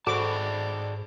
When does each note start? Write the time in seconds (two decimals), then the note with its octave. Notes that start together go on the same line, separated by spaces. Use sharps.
0.07 G#2 F#4 G#4 A4 C5 D5 A5 D6